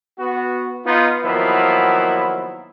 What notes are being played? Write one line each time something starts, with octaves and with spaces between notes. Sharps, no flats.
B3 F#4
B3 D#4 F4
D#3 F3 F#3 A#3 B3 E4